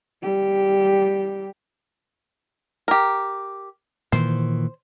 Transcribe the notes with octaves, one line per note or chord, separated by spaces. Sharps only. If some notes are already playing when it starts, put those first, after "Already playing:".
G3 G4
G4 A#4
A#2 D#3 E3 C5